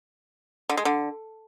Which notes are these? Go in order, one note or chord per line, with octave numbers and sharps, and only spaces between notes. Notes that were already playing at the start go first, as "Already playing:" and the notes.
D3
G#3
D3